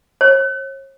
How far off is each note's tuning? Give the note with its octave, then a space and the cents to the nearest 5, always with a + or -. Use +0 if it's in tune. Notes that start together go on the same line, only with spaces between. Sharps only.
C#5 -40